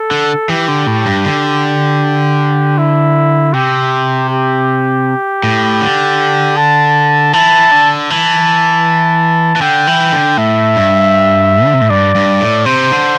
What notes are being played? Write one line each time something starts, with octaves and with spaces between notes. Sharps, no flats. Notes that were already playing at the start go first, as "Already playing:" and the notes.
Already playing: A4
D3
E3 G4
D3
A2
G2
D3
E4
C3 G4
G4
A2
D3
A5
E3 A5
D3
E3 A5
E3
D3 G5
E3
D3
A2 E5
G2
D3
C3
A2
G2 D5
G2
A2
C3 C5
D3